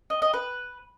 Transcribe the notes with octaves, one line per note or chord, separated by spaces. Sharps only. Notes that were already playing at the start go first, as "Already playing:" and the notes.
D#5
D#5
B4